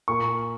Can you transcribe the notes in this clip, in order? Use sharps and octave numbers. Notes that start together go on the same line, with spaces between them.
A#2 A#3 C#6